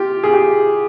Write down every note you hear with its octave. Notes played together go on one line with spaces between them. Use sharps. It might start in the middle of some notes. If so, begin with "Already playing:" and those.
Already playing: F4 G4
G#4
G4